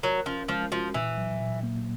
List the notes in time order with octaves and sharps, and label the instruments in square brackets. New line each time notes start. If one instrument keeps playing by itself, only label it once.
[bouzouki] F#3 [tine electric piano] A#4
[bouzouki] F3 [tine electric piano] C#4
[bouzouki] F3 [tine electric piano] G#3
[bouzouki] F3 [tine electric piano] F#4
[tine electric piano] A#2 [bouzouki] E3
[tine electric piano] F#3
A#2
A#3